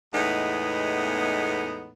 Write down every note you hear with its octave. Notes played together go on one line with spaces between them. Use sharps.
E2 A2 G#3 B3 D#4